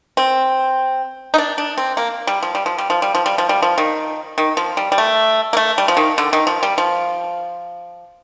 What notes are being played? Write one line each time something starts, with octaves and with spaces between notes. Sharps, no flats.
C4
D#4
D4
D4
C4
A#3
G3
F3
G3
F3
G3
F3
G3
F3
G3
F3
G3
F3
D#3
D#3
F3
G3
G3
A3
A#3
A3
G3
F3
D#3
D3
D#3
F3
G3
F3